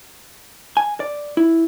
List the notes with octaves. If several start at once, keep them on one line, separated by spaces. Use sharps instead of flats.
G#5
D5
E4